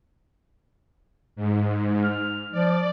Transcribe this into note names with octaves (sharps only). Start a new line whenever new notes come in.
G#2
F6
F3 D5